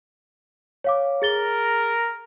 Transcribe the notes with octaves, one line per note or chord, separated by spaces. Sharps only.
C#5 F5 D6
G#4 A#4 A6 G7